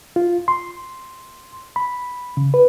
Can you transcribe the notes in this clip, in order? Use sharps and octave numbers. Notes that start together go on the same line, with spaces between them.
F4
C6
B5
C#3
B4